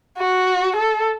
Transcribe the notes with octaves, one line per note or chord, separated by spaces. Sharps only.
F#4
A4